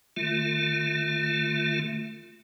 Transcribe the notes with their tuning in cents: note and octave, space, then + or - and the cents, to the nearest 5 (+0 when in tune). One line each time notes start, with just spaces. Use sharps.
D#3 -45 A3 +0 F4 +0